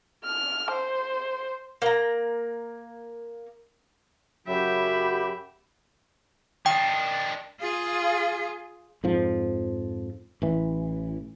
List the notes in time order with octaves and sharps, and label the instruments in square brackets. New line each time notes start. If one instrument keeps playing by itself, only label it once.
[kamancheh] F6
C5
[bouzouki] A#3 A#5
[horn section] F#2 C#3 F#3 [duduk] G4 [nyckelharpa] E5 G5 [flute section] B5
[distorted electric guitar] D#3 D4 [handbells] G5
[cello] F4 G#4
[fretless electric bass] F2 G#2 F3
A1 E3